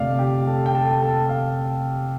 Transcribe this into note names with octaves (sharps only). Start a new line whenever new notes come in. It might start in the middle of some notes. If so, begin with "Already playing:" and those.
Already playing: F1 F2 D3 A3 D5 F5 D6
G4 G5
A4 A5
G5
A4 A5
A4 A5
F5